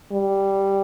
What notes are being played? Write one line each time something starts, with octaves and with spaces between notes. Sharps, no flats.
G3